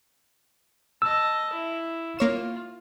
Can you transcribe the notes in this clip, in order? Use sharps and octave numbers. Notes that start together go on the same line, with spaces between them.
D#5 A5 E6
E4
A#3 F4 C#5 E7